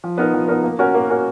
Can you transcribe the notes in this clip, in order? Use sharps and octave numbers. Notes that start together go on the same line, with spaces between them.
F3
B3 D#4 A#4
F3
B3 D#4 A#4
A#3
C#4 F#4 A#4
A#3
C#4 F#4 A#4